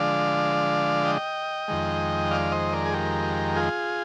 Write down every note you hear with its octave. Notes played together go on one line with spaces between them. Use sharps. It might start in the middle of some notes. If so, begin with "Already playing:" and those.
Already playing: D3 F3 G#3 D4 D5 F5
D#5 G5
F2 D#3 G#3
D5 F5
C5 D#5
A#4 D5
G#4
G4 A#4
F4 G#4